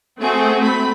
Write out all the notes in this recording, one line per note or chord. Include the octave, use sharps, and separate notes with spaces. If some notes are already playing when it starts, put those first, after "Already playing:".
A3 C4 F#4 G#4
B5